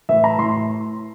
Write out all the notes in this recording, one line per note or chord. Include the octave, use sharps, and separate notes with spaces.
A2 E3 E5
A#5
A2 E3 C6
C6